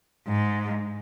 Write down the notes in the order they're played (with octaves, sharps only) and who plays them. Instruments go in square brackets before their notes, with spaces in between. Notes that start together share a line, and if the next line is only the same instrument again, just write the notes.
[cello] G#2